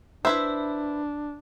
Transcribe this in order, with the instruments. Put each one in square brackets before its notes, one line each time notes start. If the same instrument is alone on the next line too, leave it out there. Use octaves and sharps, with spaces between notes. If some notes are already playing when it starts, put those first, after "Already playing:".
[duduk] D4 [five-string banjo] E4 B4 C5 [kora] E5